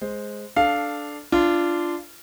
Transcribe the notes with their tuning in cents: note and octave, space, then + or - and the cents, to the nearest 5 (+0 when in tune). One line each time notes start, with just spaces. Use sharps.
G#3 +0 C5 +0
D4 +0 A4 -15 F5 +0
D4 +0 F4 -20